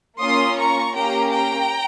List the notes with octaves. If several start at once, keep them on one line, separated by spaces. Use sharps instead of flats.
A#3 C#4 F4 C6 D#6
A#5 C#6
A#3 C#4 G4 G5 A#5
G5 A#5